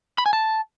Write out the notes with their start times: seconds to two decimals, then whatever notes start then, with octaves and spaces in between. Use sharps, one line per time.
0.18 B5
0.26 G#5
0.33 A5